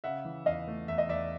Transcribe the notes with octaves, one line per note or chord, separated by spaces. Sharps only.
C#3 E5 F#5
E3
E2 D#5 F5
A3
E2 E5
D#5
E2 D5 E5